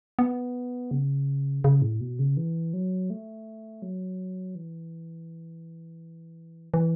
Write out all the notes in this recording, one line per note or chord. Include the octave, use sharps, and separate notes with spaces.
B3
C#3
C#3
A2
B2
C#3
E3
F#3
A3
F#3
E3
E3